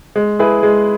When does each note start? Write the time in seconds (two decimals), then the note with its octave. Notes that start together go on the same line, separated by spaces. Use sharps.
0.16 G#3
0.39 E4 G#4 B4
0.63 G#3